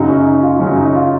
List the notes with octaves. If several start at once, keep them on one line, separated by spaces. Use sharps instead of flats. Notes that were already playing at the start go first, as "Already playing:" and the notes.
Already playing: F#2 C#3 F#3 D#4
C#4
D#4
F4
F#2 C#3 F#3 C#4
D#4
F4